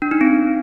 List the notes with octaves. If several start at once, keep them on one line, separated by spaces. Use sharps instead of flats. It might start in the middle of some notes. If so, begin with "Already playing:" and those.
D4
D#4
C4